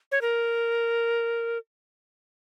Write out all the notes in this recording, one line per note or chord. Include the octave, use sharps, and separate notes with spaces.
C#5
A#4